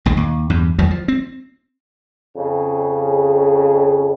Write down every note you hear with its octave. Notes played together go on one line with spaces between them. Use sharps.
A#1 D#2 D#3
D#2
E2 G2
E2 D#3 E3 F#3
F3
C4
F2 C#3